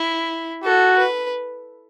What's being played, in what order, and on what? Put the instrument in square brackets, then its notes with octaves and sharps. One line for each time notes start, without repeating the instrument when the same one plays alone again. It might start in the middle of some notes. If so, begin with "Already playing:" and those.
Already playing: [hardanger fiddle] E4
[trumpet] F#4 [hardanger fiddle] A4
[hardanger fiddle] B4